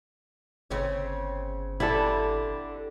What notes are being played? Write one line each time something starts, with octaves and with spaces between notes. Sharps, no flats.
G1 C#3 C4 C#4
D3 G3 E4 A4